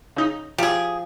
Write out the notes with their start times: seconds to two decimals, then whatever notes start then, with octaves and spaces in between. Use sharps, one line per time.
0.16 C#3 D#4
0.58 F3 F4 G4 G#4